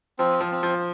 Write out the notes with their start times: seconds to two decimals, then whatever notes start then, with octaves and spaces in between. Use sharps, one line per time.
0.19 F3 C4
0.41 F3
0.51 C4
0.63 F3